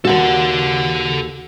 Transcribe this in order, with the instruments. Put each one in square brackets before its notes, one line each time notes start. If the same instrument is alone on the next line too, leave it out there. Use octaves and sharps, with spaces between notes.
[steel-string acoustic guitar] D#2 F#4 [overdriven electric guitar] A4 F#5